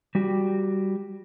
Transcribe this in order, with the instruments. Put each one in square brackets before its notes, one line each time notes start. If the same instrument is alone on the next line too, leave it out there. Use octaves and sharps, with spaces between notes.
[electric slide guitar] G3 F#4 G4